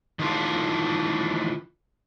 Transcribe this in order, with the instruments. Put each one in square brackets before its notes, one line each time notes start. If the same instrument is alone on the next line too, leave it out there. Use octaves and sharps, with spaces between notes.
[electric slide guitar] D#3 E3 A3 D4 F4